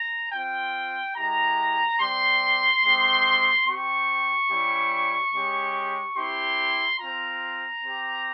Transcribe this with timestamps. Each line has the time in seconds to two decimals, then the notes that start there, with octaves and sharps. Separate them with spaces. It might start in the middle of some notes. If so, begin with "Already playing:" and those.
Already playing: A#5
0.32 C4 F4 G5
1.16 G#3 E4 G4 A#5
1.99 G3 C4 G4 C6
2.83 G#3 C4 G4
3.66 C4 G4 C#6
4.49 G3 C#4 E4 G4
5.33 G#3 C#4 G4
6.16 C4 E4 G4 C6
7.00 C4 F4 A#5
7.83 C4 G4